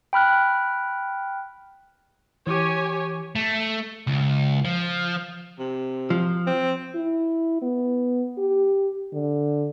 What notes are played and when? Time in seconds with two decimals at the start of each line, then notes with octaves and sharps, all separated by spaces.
0.13 G5 B5 F6 F#6
2.47 E3 G4 C#5 G#5 D6
3.36 A3
4.07 C#2
4.65 F3
5.59 C3
6.10 F3
6.47 C4
6.95 E4
7.62 B3
8.38 G4
9.13 D3